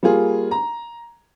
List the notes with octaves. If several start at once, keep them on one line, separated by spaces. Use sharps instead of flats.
G3 A#3 F4 G#4
A#5